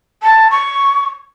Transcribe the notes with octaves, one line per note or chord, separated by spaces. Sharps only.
A5
C#6